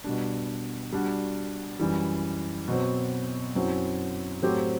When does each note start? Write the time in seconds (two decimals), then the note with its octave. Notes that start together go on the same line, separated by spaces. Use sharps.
0.04 B2 G3 D4
0.92 G3 D4 F#4
1.80 F#2 E3 G3
2.68 B2 F#3 C4
3.55 F#2 F#3 C4 E4
4.42 A2 F#3 C4 G4 C5